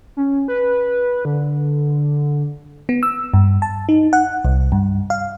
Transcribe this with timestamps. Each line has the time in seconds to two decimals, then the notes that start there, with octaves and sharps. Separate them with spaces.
0.17 C#4
0.48 B4
1.25 D3
2.89 B3
3.03 E6
3.34 G2
3.62 A5
3.89 D#4
4.13 F#5
4.45 C2
4.72 G2
5.10 F5